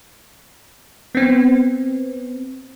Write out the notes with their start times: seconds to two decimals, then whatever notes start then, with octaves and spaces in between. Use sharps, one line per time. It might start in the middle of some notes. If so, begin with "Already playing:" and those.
1.15 B3 C4